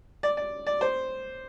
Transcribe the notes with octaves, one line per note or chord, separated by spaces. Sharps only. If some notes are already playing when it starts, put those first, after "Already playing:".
D5
D5
D5
C5